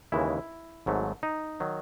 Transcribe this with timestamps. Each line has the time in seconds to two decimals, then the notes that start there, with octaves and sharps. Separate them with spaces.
0.12 D#2 C#3 E3 G#3 E4
0.86 G#1 G#2 F#3 A3
1.23 D#4
1.60 D#3 F#3